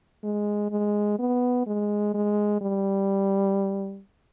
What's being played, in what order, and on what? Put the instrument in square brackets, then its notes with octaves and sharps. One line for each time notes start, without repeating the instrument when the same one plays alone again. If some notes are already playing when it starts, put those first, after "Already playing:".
[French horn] G#3
G#3
B3
G#3
G#3
G3